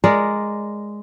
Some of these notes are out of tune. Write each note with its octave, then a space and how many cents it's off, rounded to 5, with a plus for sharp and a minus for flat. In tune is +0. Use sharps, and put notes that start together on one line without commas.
G#3 +0 A#4 +0 D5 +0